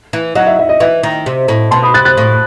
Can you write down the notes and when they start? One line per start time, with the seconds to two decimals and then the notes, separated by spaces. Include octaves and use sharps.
0.13 E3
0.35 F#3 D#5 F#5
0.47 E5
0.59 E5
0.69 D#5
0.80 E3 E5
1.03 D#3
1.26 C3
1.48 A2
1.71 B2 A5 C6
1.83 B5 D#6
1.94 C3 F#6 A6
2.05 F#6 A6
2.17 A2